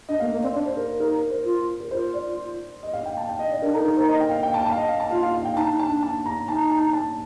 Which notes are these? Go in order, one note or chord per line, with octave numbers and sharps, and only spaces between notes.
D4 D#5
A#3 F5
A#3
C4 D5
D4 D5
C5
A#4
D#4 A#4
A#4
C5
F4
A#4
F4 C5
D5
D#5
F5
G5
A5
G5
D#5
D5
D4 A#4
D#4 A4
A#4
C5
D#5
G5
F5
G5
A5
A5
F5
D#5
F5
A5
F4 F5
F5
F5
G5
D#4 A5
D#4
A5
D4
A5
A#5
D#4 A5
A5
A5